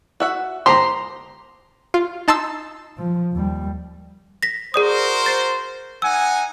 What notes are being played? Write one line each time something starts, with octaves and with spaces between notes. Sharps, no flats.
F#4 E5 F#5
G4 C5 A#5 C6
F4
D#4 A5 C6 E6
F3
D#2 G3
A#6 B6
F#4 G#4 A#4 C5 D5 D#6
A6 C7
D#4 F#5 G#5 E6